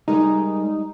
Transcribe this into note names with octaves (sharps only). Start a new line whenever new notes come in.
G3 G#3 D#4 A#4